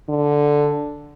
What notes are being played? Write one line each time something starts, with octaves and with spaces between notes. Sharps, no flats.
D3